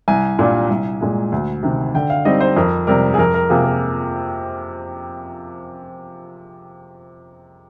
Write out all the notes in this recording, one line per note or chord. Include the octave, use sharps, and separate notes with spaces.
C2 G#5
A#2 G3 D4 F4
C2
A#2 G#3
D2
C3 D#3
D3 G5
F5
G3 C4 D#4 D#5
C5
F2 A#4
C3 G3 A#4
G#4
F2 A#4
A#4
C3 F3 A#3 F4 G#4
A#4